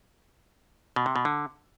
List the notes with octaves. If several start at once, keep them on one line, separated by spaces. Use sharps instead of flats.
B2
C3
B2
D3